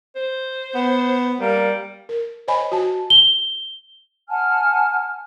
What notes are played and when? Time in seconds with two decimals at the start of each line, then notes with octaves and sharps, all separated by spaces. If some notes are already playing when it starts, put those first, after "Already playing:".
0.16 C5
0.75 B3
1.40 G3 A#3
2.09 A#4
2.48 C5 C#5 D#5 G#5 B5
2.72 F#4 A5
3.10 G7
4.28 F#5 G#5 A5 F6